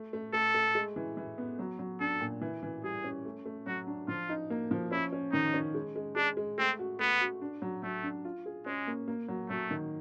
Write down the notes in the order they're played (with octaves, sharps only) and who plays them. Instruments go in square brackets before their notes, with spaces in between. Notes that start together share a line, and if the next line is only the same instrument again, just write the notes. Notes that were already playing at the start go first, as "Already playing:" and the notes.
Already playing: [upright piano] A3
A3
[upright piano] A3 [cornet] A4
[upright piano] A3
G#3
E3
E3
B3
F#3
F#3
[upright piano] D4 [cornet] A4
[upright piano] A#2
E3
E3
[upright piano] G3 [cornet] G#4
[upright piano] C#4
A3
A3
[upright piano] F#3 [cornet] F#4
[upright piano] D4
[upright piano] F3 [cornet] F4
[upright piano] D#4
A#3
F3
[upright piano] C#4 [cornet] E4
[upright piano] C#4
[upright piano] D#3 [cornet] D#4
[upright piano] C#4
G#3
G#3
[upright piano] G#3 [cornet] D4
[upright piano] G#3
[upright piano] A3 [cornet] C4
[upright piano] F#4
[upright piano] A3 [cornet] B3
[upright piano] F#4
D4
F#3
[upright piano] F#3 [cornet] A3
[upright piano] D4
F4
G#4
[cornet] G#3 [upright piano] C#4
[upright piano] A#3
A#3
F#3
[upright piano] F#3 [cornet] A3
[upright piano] D#3